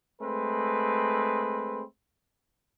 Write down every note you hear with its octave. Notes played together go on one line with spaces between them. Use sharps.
G#3 A3 C4 B4